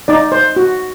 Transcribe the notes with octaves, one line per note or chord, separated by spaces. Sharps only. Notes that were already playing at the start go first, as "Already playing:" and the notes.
D#4 D5
C5
F#4